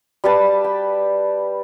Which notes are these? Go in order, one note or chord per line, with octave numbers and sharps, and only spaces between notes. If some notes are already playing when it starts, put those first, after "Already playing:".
G3 G4 B4 A5
G5